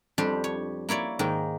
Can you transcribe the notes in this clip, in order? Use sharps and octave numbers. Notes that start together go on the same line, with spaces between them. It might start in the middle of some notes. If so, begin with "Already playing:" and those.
F2 G3 D4 G4 C6
C#5
A#3 E4 C#5 D5
G#2 D#3 A#3